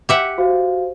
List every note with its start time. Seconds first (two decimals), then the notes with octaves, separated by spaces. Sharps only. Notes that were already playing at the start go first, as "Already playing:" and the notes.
0.09 G4 E5 F#5
0.38 F#4 C5 F5